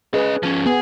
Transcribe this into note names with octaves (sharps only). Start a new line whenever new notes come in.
C#4 G#4 B4 D#5
F3 C#4
B3 G#4